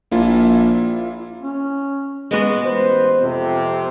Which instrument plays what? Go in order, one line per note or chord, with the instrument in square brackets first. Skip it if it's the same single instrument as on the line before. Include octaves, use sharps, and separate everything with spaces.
[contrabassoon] A#1 [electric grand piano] A#3 E4 F4
[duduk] C#4
[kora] G#3 B3 F#4
[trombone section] A1 B4 C5
F2 C3